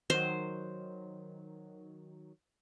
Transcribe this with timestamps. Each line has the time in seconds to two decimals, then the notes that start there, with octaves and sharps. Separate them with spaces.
0.10 D#3 F#3 C5